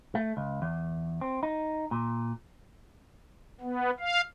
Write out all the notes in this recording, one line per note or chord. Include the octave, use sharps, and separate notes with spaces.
A3
C#2
E2
C4
D#4
A#2
B3
F5